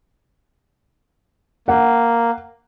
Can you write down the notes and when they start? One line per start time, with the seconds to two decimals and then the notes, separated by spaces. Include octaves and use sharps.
1.68 A#3 F#5